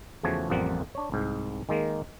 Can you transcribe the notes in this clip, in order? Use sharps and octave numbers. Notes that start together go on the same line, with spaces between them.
E2 C#3 F3 A3 F#4 G#5
A1 F2 F3 G3 A#3 F#5
D4 C#5
C2 G#2
D#3 G#3 A#3